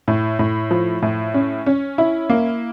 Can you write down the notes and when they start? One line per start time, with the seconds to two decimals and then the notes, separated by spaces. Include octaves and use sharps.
0.08 A2
0.39 A2
0.71 F3
1.02 A2
1.34 C#4
1.66 C#4
1.98 E4
2.30 A#3